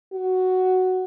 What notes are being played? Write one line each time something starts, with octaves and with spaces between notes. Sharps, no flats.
F#4